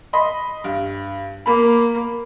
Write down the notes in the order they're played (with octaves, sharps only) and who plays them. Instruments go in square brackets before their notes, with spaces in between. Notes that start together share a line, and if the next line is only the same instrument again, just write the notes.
[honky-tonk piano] D#5 B5 C6
G2
[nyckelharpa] A#3 [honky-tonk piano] B5